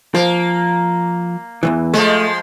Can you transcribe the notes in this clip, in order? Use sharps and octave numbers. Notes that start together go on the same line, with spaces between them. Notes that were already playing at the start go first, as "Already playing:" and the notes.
F3 A#3
E2 G2 E3
F3 G#3 A3